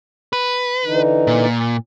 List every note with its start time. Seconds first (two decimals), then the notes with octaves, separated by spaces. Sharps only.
0.33 B4
0.85 D3 E3 D#4
1.27 A#2